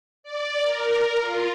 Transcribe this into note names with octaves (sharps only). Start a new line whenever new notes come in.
D5
A#4
F4